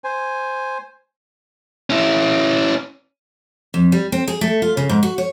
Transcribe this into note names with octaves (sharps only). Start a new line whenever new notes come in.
C5 G#5
C#4 E4
F2
G3
C4
G#4
A3
F4
C#3
G#2
F#4
C#5